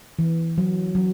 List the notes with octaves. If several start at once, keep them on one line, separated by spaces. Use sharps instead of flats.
E3
F#3
F#3